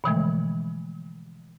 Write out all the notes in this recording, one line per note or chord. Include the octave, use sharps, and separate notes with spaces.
B2 D3 E3 F3 G#3 A3